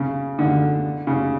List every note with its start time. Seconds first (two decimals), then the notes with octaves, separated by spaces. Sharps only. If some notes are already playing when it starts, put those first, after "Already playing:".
Already playing: C#3
0.39 D3
1.07 C#3